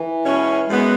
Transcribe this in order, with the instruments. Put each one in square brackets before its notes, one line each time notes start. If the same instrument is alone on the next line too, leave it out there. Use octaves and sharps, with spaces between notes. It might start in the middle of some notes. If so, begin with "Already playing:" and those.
Already playing: [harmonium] E3
[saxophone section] B2 G#3 C#4
[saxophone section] F#2 E3 B3 [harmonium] G#3